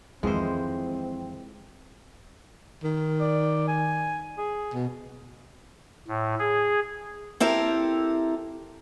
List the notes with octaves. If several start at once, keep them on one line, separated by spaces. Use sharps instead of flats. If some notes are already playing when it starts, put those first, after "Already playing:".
F2 D#3 E3 G#3 C4 E4 C5
D#3
D5
G#5
G#4
B2
A2
G#4
C4 E4 G4 A4 A#4